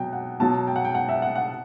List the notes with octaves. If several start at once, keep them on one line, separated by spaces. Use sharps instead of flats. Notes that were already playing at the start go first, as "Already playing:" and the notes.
Already playing: B2 F#3 G5
F#5
B2 F#3 A5
G5
F#5
G5
F#5
E5
F#5
F#5